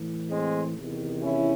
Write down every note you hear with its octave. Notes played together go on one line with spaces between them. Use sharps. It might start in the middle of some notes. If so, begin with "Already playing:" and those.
Already playing: A2 E3
G#3 C4
E2 C3 D#3
C#4 E4